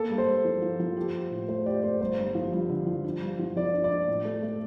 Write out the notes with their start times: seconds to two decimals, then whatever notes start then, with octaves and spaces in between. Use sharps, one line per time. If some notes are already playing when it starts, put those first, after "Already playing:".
Already playing: A#3 A4
0.10 G2
0.18 C5
0.27 G2
0.45 F3
0.62 F3
0.79 F3
0.97 G4
1.14 G4
1.31 A2
1.48 A3 C5
1.66 G4 D5
1.83 A3 C5
2.00 G1 C5
2.18 G2
2.35 F3
2.52 G2
2.69 D3
2.87 F3
3.04 D4
3.21 G2
3.39 F3
3.56 F3 D5
3.73 D4
3.84 D5
3.91 D4
4.08 A2
4.25 A3
4.43 A3